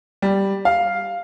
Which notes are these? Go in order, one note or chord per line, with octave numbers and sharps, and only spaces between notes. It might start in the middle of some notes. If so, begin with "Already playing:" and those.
G3
F5